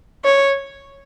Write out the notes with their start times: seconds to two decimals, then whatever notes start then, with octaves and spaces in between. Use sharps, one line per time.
0.25 C#5